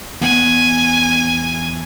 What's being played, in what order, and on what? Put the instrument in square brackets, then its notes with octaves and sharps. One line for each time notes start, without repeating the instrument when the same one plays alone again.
[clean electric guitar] E2 B3 F#5 [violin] G#5